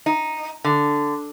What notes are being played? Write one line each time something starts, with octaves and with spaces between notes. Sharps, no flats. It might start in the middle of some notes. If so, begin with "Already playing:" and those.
D#4
D3